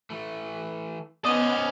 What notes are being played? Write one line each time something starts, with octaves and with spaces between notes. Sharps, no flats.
E3 A3
B3 C#4 C5 D5 D#5